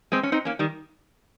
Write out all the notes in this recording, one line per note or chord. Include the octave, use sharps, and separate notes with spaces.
G#3 C4
C#4
C4 D#4
A#3 C#4
D#3 G3